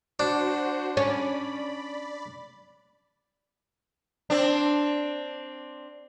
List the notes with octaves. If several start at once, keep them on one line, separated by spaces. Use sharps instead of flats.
D4 F#4 C5 F#5
C#4 D5 B5
C4 D4